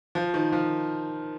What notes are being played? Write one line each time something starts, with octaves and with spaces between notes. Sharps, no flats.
F3
D#3
F3